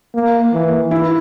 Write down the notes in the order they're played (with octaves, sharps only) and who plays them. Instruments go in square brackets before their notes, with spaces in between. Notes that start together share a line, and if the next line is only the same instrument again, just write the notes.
[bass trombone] A#3
E3
[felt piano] E4